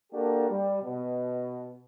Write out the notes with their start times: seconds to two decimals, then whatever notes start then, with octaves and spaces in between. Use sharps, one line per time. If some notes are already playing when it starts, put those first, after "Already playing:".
0.13 A#3 D4 F#4 G4 A4 A#4
0.50 G3
0.82 B2